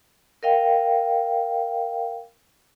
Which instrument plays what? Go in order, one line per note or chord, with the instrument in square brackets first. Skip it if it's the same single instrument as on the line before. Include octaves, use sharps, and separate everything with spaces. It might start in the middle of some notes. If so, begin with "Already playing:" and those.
[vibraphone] A#4 D#5 F5 G5